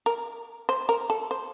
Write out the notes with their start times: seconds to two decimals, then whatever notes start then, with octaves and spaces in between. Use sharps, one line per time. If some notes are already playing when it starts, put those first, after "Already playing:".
0.06 A#4
0.69 C5
0.89 A#4
1.10 A4
1.31 C5